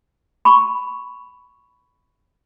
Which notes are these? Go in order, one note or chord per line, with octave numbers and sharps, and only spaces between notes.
B5 C#6